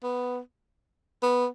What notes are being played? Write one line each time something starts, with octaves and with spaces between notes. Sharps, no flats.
B3
B3